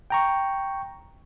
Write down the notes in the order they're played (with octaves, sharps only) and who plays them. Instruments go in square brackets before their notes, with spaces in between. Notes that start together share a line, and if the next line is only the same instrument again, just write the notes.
[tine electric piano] G5 A#5 C#6